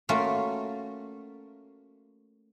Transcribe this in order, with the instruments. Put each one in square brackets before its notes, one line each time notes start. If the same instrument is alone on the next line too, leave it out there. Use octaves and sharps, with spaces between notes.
[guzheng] A3 A#3 C#4 F4 F#4